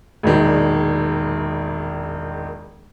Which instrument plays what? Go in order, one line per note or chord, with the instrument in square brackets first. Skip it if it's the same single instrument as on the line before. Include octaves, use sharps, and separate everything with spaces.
[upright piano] E1 A#1 D#3